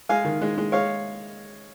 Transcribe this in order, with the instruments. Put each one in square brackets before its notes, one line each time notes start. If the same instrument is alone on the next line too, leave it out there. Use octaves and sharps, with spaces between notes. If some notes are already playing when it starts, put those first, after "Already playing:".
[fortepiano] G#3 F5 G#5
D#3
G#3
G#3
G#3 C#5 F5